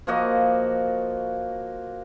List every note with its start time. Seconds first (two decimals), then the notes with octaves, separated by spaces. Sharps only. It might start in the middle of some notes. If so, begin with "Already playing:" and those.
0.07 F3 A#3 F#4 D#5